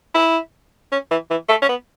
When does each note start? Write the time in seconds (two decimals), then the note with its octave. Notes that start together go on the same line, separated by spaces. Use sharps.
0.15 E4
0.92 C#4
1.11 E3
1.31 E3
1.49 A3
1.62 C#4
1.69 B3